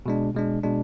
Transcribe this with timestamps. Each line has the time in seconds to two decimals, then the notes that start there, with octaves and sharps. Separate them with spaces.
0.06 B2 G#3 D4
0.35 B2 G#3 D4
0.64 B2 G#3 D4